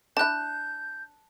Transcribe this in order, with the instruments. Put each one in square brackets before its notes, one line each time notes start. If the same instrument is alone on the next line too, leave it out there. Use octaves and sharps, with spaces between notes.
[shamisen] D4 E4 [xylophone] A5 F#6 [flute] G6